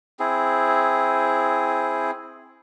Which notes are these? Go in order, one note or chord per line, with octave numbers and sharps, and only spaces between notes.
C4 E4 G#4